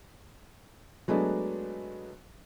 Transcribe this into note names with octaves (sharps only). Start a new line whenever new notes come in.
F#3 G#3 A3 B3 D4